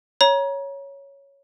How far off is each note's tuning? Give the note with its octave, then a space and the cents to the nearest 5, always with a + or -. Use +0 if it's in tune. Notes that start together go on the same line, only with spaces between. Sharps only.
C#5 +0 A#5 +30